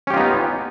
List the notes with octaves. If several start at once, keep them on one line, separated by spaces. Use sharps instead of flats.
B3 C#4 D#4 F4 G4